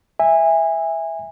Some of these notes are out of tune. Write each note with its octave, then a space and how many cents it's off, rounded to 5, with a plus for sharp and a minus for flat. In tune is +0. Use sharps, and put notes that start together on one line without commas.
E5 +0 G#5 -25